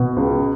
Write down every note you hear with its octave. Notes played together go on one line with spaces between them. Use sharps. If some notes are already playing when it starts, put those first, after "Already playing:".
Already playing: B2
C#2